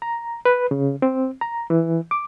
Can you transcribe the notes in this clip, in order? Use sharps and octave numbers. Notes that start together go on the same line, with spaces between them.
A#5
B4
C#3
C4
A#5
E3
D6